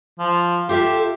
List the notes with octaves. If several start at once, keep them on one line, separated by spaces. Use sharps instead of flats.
F3
F4 G4 A4 E5